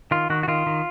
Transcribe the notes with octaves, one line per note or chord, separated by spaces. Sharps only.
D#3 F4
D#3 F#4
F#4
D#3 F4
D#3